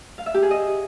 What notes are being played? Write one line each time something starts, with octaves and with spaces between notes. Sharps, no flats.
F5
E5
G4
G#4
D#5